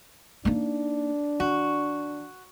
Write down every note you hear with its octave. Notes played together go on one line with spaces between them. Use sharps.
A#3 D4 D#4
D#3 F#4